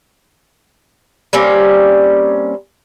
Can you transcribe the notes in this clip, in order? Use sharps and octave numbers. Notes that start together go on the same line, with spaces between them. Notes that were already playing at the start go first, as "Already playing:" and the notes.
G3 A#3 C4 C#4